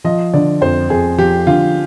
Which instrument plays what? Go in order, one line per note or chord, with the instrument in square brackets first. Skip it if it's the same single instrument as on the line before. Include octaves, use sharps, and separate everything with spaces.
[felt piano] F3 [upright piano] D#5
[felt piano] D3 [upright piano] D5
[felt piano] F2 [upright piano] C5
[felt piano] F2 [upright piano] G#4
[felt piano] F3 [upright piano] G4
[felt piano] D3 [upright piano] F4